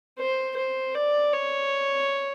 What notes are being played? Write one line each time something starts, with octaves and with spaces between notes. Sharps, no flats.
C5
C5
D5
C#5